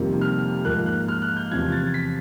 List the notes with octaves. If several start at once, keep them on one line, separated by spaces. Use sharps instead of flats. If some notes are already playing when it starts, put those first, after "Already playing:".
Already playing: F2 C3 D#3 G3 A#3
F6
G#2 F3 A#3 F#6
F#6
F6
F#6
G6
E2 C3 F3 G#6
A6
B6